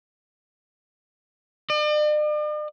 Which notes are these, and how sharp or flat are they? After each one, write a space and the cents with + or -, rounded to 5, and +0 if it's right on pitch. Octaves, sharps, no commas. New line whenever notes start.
D5 +45